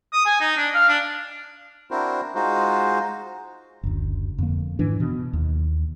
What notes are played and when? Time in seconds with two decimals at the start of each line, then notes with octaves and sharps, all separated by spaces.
0.13 D#6
0.26 G#5
0.40 D#4
0.57 D4
0.74 F5
0.89 D4
1.91 C4 D4 E4 F#4 A#4 C5
2.35 G#3 D#4 F4 F#4 C5
3.83 F#1 D2
4.38 F2 D3 A#3
4.79 G#2 D#3 E3 D4
5.00 B2
5.33 D#2